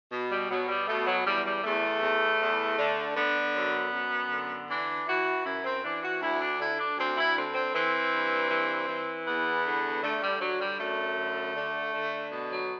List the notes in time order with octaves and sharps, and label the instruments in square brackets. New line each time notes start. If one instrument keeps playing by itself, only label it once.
[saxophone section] B2
G3
B2 F#3
G3
B2 A3
F#3
E2 G3
G3
E2 A3
E2
E2
D3
D3 B3
F#2
F#2
D3
E3 D4
E3 F#4
F#2 E4
C4
E3 D4
F#4
D2 E4
D4
D3 E4
D4
D2 C4
E4
D3 C4
C4
E3 C4
G2
E3
E3
E2 B3
D3
D3 A3
G3
D3 F#3
G3
F#2 A3
D3
D3
D3
B2
F#3